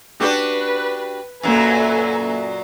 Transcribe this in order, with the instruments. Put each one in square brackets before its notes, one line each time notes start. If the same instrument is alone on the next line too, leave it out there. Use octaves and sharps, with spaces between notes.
[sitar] D4 F#4 G4 [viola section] B4
[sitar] F#2 A#2 F#3 [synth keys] A#3 E6 [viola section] A4 B4 G#5